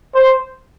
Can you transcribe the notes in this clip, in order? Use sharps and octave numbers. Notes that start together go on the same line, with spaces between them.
C5